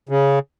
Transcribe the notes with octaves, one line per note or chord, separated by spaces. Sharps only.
C#3